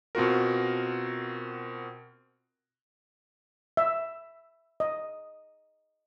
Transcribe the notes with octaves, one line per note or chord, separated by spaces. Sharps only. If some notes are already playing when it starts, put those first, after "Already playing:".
B2 C4 F4 F#4 A#4
E5
D#5